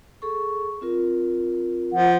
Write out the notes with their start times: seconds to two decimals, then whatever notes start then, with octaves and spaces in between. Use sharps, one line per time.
0.22 G#4 A4 C#6
0.81 C4 F4 A#4
1.93 F3 F#5